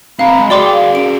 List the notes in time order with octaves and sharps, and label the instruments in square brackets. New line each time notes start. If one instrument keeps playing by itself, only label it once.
[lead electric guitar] C4 A#5 [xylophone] F5 [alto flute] B5
[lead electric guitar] G#3
[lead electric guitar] F#4 G#4 [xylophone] D5 C6 D6 [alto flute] G5
[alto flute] F5
[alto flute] C#4 [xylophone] D7